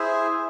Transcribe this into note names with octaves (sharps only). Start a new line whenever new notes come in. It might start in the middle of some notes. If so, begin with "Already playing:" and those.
Already playing: E4 G#4 C5 E5 G#5